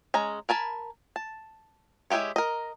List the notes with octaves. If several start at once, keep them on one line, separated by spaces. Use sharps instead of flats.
G#3 C#4 A#5
A#4 G#5 A5 B5
A5
G#3 E4 F#4 G4 C#5
A#4 D#5